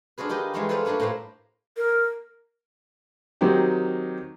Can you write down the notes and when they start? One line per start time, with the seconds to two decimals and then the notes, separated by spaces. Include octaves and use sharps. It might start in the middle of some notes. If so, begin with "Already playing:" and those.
0.18 D4 F4 F#4 G#4 B4
0.29 D#3 D#4 G4 B4 D#5
0.54 E3 G3 G#3 D#4 F4 F#4
0.69 F4 A4 B4 C5 D5 F5
0.85 G3 A#3 D4 B4 C#5
1.00 A2 G4 A#4 C5 F5 F#5
1.77 A#4
3.41 D#3 F#3 C4 D#4 G4